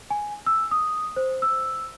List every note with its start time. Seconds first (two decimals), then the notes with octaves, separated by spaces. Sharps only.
0.10 G#5
0.46 E6
0.71 D#6
1.16 C5
1.42 E6